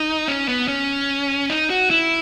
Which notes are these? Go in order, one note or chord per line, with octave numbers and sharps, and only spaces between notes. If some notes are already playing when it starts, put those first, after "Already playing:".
Already playing: D#4
C#4
B3
C#4
D#4
F#4
E4